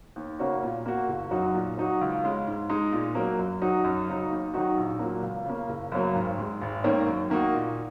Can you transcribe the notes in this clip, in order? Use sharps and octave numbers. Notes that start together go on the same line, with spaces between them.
D#2
C#3 A#3 C#4 F#4
A#2
A#3 F#4
F#1
F#2 F#3 D#4 F#4
A#2
F#3 D#4 F#4
C#2
C#3 G#3
G#2
G#3 D#4
A#2
F#3 A#3
F#2
F#3 D#4 F#4
F#2
C#3 F#3 D#4
D#2
D#3 F#3 D#4 F#4
A#1
A#2 F#3 A#3
C#2
C#3 A#3
F#1
F#2 C#3 F#3 A#3
G#1
G#2 G#3
G#1
G#2 D#3 A#3 C#4
F#2
D#3 A#3 D#4 F#4
A#2